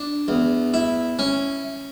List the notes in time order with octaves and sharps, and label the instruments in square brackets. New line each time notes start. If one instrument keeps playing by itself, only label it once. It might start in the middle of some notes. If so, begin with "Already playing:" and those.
Already playing: [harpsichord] D4
E2
E4
C#4